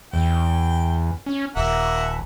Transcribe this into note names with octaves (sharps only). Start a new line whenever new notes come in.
E2 G5
C#4
D#1 A#3 E5 F#5